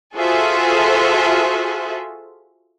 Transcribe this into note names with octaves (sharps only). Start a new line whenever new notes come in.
F4 F#4 G#4 A4 C5 E5